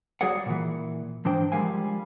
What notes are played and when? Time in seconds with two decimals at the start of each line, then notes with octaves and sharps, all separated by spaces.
0.21 G3 F#4 G#4 C#5 D5 F#5
0.46 A#2 E3
1.25 G#2 E3 D4 C5 G5
1.52 F3 G3 G#3 A#4 F5 G#5